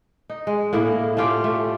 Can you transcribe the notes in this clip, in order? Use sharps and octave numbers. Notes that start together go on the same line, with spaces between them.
D#4
G#3
A2 A#3 E4 A#4
A3 C#4 F4 G4
A3